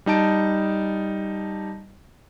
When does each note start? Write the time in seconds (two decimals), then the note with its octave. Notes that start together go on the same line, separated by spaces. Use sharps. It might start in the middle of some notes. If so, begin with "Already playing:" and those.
0.06 G3 D#4 A5 D7